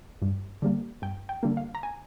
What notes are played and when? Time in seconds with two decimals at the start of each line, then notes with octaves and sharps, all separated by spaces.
0.22 G2
0.62 D3 G3 A#3
1.02 G2 G5
1.29 G5
1.43 D3 G3 A#3
1.57 F5
1.75 A#5
1.83 G#5